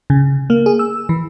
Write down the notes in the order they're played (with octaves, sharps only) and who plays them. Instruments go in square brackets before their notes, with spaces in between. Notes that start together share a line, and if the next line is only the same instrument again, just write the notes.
[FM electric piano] C#3
A#3
G#4
E6
E3